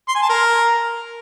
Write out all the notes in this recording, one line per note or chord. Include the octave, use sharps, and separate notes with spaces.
C6
G#5
A5
A#4